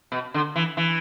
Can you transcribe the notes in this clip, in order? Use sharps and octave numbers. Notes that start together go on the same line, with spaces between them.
B2
D3
E3
E3